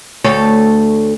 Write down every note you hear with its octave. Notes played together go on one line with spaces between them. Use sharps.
D2 A4 C#5